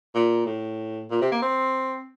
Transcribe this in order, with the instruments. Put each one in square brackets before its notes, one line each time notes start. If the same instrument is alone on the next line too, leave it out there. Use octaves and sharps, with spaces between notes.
[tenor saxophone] A#2
A2
A#2
C3
A#3
C4